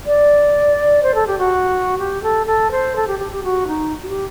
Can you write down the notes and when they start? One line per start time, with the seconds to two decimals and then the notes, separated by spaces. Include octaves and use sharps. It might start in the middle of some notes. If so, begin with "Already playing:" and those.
0.06 D5
1.03 C5
1.15 A4
1.27 G4
1.38 F#4
1.98 G4
2.23 A4
2.47 A4
2.71 C5
2.96 A4
3.07 G4
3.19 G4
3.32 G4
3.44 F#4
3.67 D#4
4.03 F#4
4.08 G4